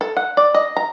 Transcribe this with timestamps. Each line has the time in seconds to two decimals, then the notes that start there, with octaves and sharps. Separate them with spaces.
0.01 A4
0.17 F#5
0.37 D5
0.54 D#5
0.77 A#5